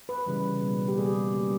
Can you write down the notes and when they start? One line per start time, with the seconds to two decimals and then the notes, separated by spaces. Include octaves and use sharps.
0.09 B4
0.26 C#3 E3 G3
0.62 B2 G3 A#3
0.88 G4
0.98 B2 G3 A#3 G#4
1.34 C#3 G3 A#3